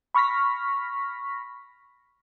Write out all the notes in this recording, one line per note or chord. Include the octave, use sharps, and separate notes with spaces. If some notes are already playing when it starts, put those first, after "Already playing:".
B5 C#6 F6 A#6 B6